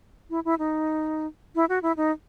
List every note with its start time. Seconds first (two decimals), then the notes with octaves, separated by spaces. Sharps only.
0.30 E4
0.45 E4
0.59 D#4
1.55 E4
1.69 F#4
1.83 E4
1.97 D#4